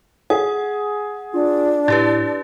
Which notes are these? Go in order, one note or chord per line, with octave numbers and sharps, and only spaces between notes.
G#4 F#5
D4 F4
A2 E4 G4 B4 A6